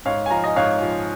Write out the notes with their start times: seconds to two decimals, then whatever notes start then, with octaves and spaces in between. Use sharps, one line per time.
0.05 G#2 C#5 F5
0.26 G#5
0.30 F3 F5 A#5
0.44 D#5 G#5
0.56 G#2 C#5 F5
0.82 F3